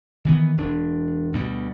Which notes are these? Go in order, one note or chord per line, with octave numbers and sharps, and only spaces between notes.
D#3 E3 B3
E1 D4
D2 B2 G3